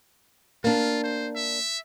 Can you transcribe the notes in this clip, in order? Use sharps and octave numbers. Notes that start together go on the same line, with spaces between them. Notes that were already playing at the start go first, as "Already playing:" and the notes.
A#3 D4 F4
C5
E5